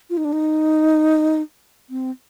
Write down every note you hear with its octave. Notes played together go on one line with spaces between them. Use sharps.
F4
D#4
D4
D#4
C4